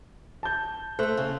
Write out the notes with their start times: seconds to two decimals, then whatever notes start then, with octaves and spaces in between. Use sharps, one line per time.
0.43 A5 G6
0.99 A3 A4 C5 F#6
1.17 C#3